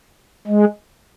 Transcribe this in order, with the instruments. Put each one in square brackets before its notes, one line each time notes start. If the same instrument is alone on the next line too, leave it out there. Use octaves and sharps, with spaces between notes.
[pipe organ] G#3